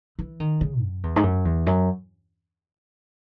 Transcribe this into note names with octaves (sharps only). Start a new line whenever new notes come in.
E3
D#3
C#3
F#2
E2
G#2
F#2
E2
F#2